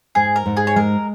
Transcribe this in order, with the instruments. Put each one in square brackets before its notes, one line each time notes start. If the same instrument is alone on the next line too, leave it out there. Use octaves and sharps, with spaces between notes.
[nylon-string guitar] G#2 [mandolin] G#4
[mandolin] A#4
[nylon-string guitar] G#2
[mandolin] G#4
C#5
[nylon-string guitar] G#3 [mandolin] A#4